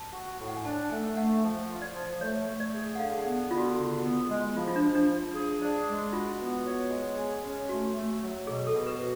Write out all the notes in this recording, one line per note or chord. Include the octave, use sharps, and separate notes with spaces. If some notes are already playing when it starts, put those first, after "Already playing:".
Already playing: A5
F#4
A2
F#5
G#5
D4 A5
A3 G#5
A3 F#5
F3
F4
D5
F3
A3 C#5
A3
D5
G#4
F#5
D3 F5
F#5
B3
D3 F4
F#4
C#3
B3
G#3
F3 F4
F4
D4
F3
D4
F3
G#4
D4
G#3
F4 F#4
B3
C#5
G#3
G#4
C#4
A3 F#4
A3
F#3
B2 G#4
A4
B2
B4
F#4